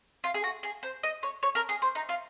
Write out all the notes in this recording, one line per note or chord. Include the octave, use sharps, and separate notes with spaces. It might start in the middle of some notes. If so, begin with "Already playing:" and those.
F4
G#4
F#4
G#4
C5
D#5
C#5
C#5
A#4
G#4
C5
D#4
F4